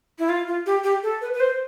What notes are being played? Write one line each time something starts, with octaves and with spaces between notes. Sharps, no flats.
E4
F4
F4
G4
G4
A4
B4
B4
C5